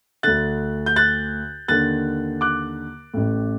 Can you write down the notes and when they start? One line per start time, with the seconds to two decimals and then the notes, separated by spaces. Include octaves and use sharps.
0.23 D2 D3 F#6 A6
0.86 G6
0.96 F#6 A6
1.68 D#2 D3 F#6 A6
2.41 D6 F#6
3.14 A1 A2